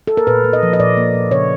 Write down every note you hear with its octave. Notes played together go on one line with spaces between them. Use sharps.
A4
A#4
A#2 B4
A#3
D#5
F3
D#5
A#2 D5
A#3
A#2
C#3 C#5